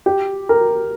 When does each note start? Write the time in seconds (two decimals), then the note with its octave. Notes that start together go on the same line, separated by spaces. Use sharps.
0.06 G4
0.49 A#4